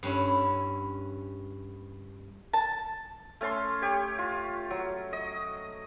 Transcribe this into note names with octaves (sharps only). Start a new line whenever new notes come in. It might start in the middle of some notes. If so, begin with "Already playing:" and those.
G2 C#4 E4
A5
A3 C#4 A5 C6
G4 C#5
F4
F#3
D#5